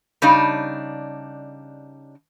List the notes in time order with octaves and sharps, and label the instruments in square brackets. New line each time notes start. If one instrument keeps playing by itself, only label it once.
[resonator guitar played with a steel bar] C#3 G3 D4 D#4